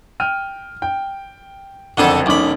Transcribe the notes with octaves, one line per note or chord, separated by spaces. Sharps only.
G5 F6 D#7
G5
F#1 F2 D3 A4 F#5
E1 B1 C#4 B5 D6